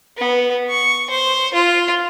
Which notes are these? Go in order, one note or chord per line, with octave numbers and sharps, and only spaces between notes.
B3
C#6
C5
F4